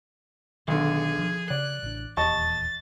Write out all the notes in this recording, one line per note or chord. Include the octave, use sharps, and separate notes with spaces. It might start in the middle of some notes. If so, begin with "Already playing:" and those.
B1 D3 D#3 G#4
F3
C#3 D5 F#6
A1 D4
D#1 E2 A#3 D#5 A5 C#6 A6